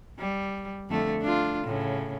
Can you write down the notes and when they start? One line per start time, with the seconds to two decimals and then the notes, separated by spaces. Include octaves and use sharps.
0.19 G3
0.90 F2 D3 A3
1.21 D4 F4
1.64 A2 C#3